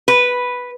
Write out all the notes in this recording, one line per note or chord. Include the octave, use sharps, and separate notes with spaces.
B4